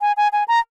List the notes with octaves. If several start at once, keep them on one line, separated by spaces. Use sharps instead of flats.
G#5
G#5
G#5
A#5